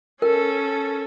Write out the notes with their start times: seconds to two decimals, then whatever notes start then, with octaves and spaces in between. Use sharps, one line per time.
0.22 C#4 A4 A#4